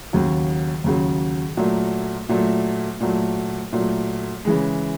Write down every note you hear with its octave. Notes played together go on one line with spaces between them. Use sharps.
D#2 C#3 F#3
D#2 C#3 F#3
A#2 F#3 A3
A#2 F#3 A3
A#2 F#3 A3
A#2 F#3 A3
C#3 E3 G#3